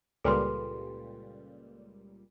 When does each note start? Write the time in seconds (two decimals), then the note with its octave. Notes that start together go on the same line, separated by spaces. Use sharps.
0.24 C#2 A#2 G3 A4 B4 C6